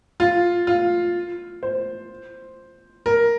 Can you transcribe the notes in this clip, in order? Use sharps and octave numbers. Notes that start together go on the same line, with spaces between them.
F4
F4
C5
A#4